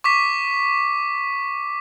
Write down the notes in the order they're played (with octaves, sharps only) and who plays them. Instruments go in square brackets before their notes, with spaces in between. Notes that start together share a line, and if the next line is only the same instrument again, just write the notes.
[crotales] C#6 D6 B6